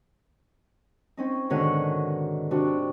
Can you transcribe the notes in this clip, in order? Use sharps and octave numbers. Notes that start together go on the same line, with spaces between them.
C4 C#4 D#4
G#2 B2 D3 D#3 C#5 F#5
C3 D4 F#4